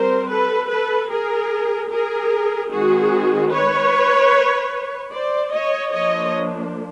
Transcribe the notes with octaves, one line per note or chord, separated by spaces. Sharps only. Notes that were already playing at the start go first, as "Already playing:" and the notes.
Already playing: G3 C4 A#4 C5
A4 B4
A4 B4
G#4 A#4
G#4 A#4
D#3 G#3 C4 F#4 G#4
B4 C#5
C5 D5
C#5 D#5
F3 A#3 D4 C#5 D#5